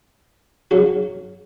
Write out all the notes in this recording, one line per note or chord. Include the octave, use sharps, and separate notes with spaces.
C#3 F#3 F#4